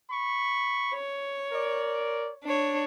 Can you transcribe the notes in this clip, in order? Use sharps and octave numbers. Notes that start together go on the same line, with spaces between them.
B5 C#6
C#5
A#4 D5
D4 C#5